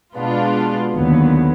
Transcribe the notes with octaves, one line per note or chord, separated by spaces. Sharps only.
B2 G#3 B3 D4 F4
D#2 D3 F#3 B3